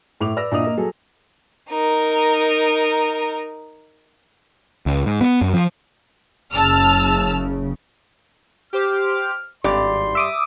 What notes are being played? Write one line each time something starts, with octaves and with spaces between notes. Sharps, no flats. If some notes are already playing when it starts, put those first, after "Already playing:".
A2 E4 D6 F7
B4 D5 E6 A#6
A#2 D4 E4 D#5 D#6 F7
A#3 D#5
F#3 G#4 A4
D#4 A#4
C#2
G#2
B3
F#2
F3
F#1 C#3 A5 E6 F6
G4 C5 D6 F6
G#1 G2 G4 D5 C6
E5 D6 D#6